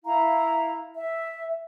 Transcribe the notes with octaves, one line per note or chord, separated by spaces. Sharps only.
E4 F5 A#5
E5